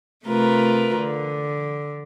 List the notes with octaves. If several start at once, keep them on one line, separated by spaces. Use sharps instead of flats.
C3 A3 F4 A#4 B4
D3